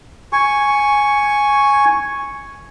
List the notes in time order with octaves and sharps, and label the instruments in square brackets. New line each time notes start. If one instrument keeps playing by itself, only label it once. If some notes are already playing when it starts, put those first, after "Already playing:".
[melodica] G#5 C#6